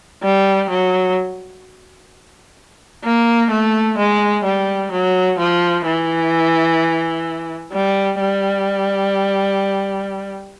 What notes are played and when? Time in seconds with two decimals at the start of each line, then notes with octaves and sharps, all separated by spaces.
0.23 G3
0.70 F#3
3.04 A#3
3.50 A3
3.98 G#3
4.44 G3
4.91 F#3
5.39 F3
5.85 E3
7.72 G3
8.19 G3